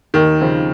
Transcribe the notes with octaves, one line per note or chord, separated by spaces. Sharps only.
D#2 D#3
C#3 F3 C4